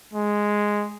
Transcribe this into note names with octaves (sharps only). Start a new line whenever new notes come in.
G#3